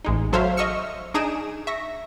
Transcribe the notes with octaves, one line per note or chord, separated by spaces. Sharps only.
A1 G#3 D#4
F#3 A4 C5 C#5 E5 F5
D#5 E5 C#6 E6 F6 C#7
D4 D#4 G#4 D7 E7
E5 C#6 A#6